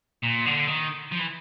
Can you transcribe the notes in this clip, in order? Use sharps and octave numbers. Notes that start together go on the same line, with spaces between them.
A#2
D3
D#3
F3
E3